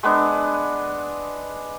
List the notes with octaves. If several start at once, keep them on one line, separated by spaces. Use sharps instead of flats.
G#3 B3 D4